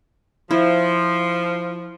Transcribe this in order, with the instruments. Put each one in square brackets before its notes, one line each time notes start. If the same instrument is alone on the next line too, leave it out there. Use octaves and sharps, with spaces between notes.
[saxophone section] F3 [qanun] E4